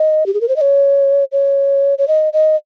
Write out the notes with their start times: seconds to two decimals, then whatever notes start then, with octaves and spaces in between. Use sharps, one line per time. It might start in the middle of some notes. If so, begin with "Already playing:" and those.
Already playing: D#5
0.26 G4
0.34 G#4
0.41 A#4
0.48 C5
0.56 D#5
0.61 C#5
1.32 C#5
1.98 C#5
2.08 D#5
2.33 D#5